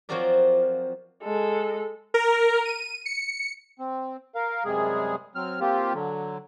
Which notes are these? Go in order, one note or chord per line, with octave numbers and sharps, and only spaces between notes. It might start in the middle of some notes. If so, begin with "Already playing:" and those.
F3 F#3 C4 F#4 A#4 D5
G#3 A4
A#4
D#7
C#7
C4
A#4 F5
F#2 C3 G3 G#3 G#4
F#3 C4 F6
A#3 C4 F4 G4
D3 F#3